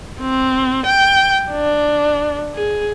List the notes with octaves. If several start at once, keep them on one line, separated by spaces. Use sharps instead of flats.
C4
G5
D4
G#4